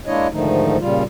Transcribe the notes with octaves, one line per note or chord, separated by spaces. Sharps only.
G#3 A#3 D4 E4 C#5 D#5
G#2 D3 D#3 F3 A3 D#4
A#2 C#3 G3 F4